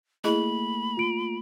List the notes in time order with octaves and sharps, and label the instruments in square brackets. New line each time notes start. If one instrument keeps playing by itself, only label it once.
[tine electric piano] A3 A#3 [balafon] E4 G#4 D#5 [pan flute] B5
[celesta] F4 D7